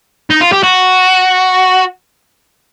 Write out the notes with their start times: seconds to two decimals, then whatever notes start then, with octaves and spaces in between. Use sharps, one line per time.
0.30 D#4
0.41 F4
0.52 G4
0.63 F#4